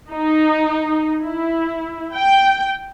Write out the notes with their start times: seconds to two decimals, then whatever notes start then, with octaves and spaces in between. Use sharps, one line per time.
0.10 D#4
1.21 E4
2.15 G5